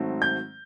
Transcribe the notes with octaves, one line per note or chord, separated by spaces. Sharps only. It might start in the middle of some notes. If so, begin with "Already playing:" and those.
Already playing: G#2 D#3 F#3 A3 C4
G6